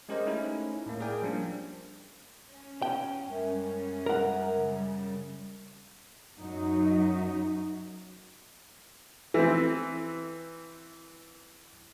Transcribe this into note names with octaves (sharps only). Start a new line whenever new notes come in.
G#3 C#4 G4 A#4 C5 D#5
A3 C#4 D#4 E4
A2 A#3
G#4 A#4 D5 G5 G#5
F3 G3 A#3 C#4 D4
C#4
G5
F#2 G3 G#3 C#4
A#4 F#5
C#3 G3
F#2 F#3 D#4
E3 C4